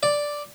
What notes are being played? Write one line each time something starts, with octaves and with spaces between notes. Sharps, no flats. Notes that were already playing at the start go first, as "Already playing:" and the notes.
D5